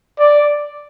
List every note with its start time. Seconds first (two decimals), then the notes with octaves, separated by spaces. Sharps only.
0.19 D5